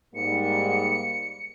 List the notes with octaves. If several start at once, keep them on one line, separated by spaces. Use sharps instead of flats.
G#2 G3 A#3 C#7